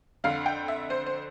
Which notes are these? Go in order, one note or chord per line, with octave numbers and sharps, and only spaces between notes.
F2 D3 F5
G5
E5
C5
C5